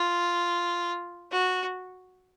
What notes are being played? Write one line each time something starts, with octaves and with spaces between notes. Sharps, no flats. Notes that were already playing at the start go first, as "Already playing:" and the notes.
Already playing: F4
F#4